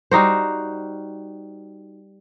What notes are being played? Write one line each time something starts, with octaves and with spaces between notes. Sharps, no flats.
G3 D#4 F#4 C5